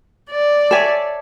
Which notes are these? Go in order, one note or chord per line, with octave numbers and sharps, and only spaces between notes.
D5
A4 C#5 E5 G#5